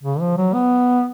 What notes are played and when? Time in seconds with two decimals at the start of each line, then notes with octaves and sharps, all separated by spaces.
0.03 C#3
0.20 F3
0.37 F#3
0.54 B3